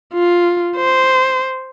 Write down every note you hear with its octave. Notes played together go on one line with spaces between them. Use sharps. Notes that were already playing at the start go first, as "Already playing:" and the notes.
F4
C5